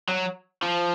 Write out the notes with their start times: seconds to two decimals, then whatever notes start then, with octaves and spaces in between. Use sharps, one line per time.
0.09 F#3
0.62 F3